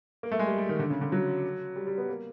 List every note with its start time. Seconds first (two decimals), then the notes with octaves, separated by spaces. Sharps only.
0.23 A#3
0.31 A3
0.39 G#3
0.47 G3
0.58 G3
0.69 D#3
0.79 D3
0.90 C#3
1.01 D3
1.12 F#3
1.76 G3
1.87 G3
1.98 B3
2.09 A#3